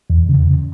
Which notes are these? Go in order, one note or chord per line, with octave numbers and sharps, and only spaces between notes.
E2
C#3
E2